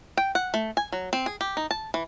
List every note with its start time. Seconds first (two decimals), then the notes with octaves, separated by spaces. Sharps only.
0.17 G5
0.35 F#5
0.54 A3
0.77 G#5
0.92 F#3
1.13 C4
1.26 G#4
1.41 G4
1.57 D#4
1.71 A5
1.94 E3